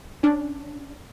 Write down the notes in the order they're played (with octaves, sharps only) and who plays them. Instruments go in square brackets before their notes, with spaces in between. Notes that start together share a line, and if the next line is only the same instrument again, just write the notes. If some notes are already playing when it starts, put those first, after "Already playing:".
[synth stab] C#4 D4